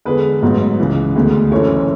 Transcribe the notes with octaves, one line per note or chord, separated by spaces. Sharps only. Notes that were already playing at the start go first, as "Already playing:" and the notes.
E2 D3 G#3 G#4 B4
A1 G#2 F#3 B3
C#2 C#3 E3
D2 D3 G#3 B3
F#1 F#2 E3 A4 C#5